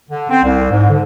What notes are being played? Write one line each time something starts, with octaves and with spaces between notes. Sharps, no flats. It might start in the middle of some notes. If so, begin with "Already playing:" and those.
D3
C4
C2
G#2
D3